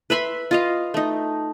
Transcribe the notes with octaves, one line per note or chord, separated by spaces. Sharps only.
B4 E5 B5 C6
F4 D#5 F5
A3 D#4